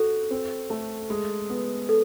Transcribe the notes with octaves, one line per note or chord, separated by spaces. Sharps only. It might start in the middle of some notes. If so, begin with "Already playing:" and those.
Already playing: F#4 A4
C4
A3
G#3
B3
A4